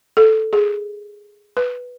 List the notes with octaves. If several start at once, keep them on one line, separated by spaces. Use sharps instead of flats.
A4
G#4
B4